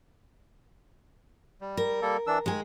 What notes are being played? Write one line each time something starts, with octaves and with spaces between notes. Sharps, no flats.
G3
A#4
G3 A#3 A4
E3 D4 E6
D#3 G#3 G#4